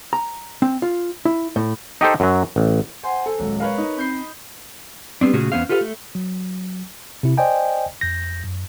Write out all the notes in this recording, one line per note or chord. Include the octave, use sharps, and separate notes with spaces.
A#5
C4
F4
E4
A2
D#4 G4 A4 C5
F#2 F#3
A1
C5 F#5 G#5 C6
A4
D#1 F#3 G#3
A#4 B4 C#5 F5
D#4
C4 B5 G6 C7
G3 B3 C4 D4
A#2 C#3 A3 C#4 F#4 G#4
E2 B3 C#4 C5 F5
F4 G4 A4 B4 E5 F5
A3
F#3
C3 E4
C5 D5 D#5 G5 G#5
F2 G6 A#6
F#2